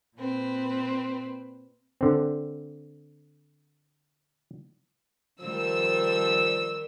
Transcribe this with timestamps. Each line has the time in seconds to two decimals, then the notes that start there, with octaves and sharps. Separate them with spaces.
0.17 A#2 C4 B4
2.01 D3 C4
5.41 D#3 F3 G3 A#4 E6